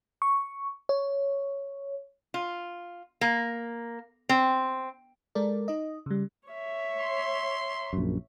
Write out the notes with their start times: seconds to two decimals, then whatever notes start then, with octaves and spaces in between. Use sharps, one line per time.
0.22 C#6
0.89 C#5
2.34 F4
3.21 A#3
4.29 C4
5.35 G#3 A4 A#4 D5
5.68 D#4 D#5
6.06 C#3 G3
6.48 C#5 E5
6.99 C6
7.93 A#1 F#2